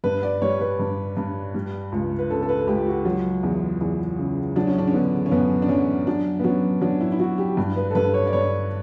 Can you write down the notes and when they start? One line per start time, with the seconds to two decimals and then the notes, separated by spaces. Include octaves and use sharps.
0.04 G2 B4
0.23 D5
0.42 G3 C#5
0.60 B4
0.79 G2
1.17 G2
1.54 G3
1.92 C#2
2.19 B4
2.30 C#3 A4
2.42 A4
2.49 B4
2.67 C#2 G4
2.87 F#4
3.05 F#3
3.43 E2
3.81 E2
4.18 C#3
4.56 F#3 D4
4.67 C#4
4.78 D4
4.88 C#4
4.94 D3 B3
5.26 C#4
5.31 F#2 B3
5.62 D4
5.69 F#2 C#4
6.07 F#3 D4
6.40 B3
6.44 F#3 C#4
6.81 F#3 D4
7.01 E4
7.12 E4
7.19 F#3 F#4
7.38 G4
7.57 G2
7.76 B4
7.90 A4
7.95 G2 B4
8.14 C#5
8.27 D5
8.33 G2 C#5